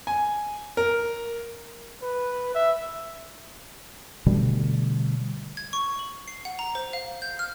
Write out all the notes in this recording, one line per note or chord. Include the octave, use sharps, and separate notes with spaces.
G#5
A#4
B4
E5
B2 D3 G3 A3
G#6
C#6
F#7
C7
F#5
A#5
C5
F5
G6
F6